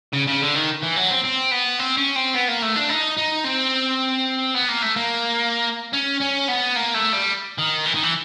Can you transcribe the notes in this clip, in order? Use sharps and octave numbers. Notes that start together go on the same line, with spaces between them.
C#3
C#3
D3
D#3
E3
F#3
C4
C4
B3
C4
C#4
C4
B3
A#3
A3
D4
D#4
D#4
C4
B3
A#3
A3
A#3
C#4
C#4
B3
A#3
A3
G3
D#3
E3
D#3
E3